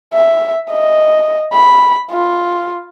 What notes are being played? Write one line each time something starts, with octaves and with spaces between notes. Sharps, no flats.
E5
D#5
B5
F4